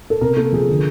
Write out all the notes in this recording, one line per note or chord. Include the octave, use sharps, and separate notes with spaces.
A4
C3 A#4
A#3 A4
F3 G#4
D3